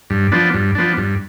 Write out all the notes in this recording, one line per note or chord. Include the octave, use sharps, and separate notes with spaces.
G2
F3 B3 D4
G2
F3 B3 D4
G2